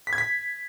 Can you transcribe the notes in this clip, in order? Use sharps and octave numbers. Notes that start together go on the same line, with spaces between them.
B6
G#6
B6